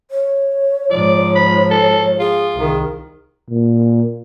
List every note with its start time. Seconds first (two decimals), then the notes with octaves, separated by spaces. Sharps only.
0.11 C#5
0.91 G#2 F3 D5
1.35 B5
1.71 A4
2.19 F4 G#4
2.55 C2 D#3
3.51 A#2